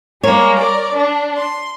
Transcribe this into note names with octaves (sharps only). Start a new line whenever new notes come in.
G3 G#3 A#3 C#5
A#4 D5
D4
C6